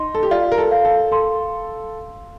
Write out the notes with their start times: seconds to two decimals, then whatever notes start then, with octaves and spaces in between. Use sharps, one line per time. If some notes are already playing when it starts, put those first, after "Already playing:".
Already playing: D#4 C6
0.15 A4
0.23 G4
0.31 F4 D5
0.52 A#4
0.58 A4
0.71 F5
0.85 A4
1.12 A4 C6